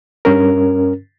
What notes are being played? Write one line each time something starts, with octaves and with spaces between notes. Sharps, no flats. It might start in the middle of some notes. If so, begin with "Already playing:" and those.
G2 C#4 A#4